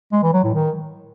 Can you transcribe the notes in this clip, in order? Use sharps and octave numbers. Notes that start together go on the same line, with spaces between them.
G#3
E3
F#3
A2
D#3